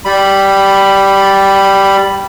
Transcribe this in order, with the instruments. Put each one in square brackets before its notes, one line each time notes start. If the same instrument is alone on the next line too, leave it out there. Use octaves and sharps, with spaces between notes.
[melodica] G3 B5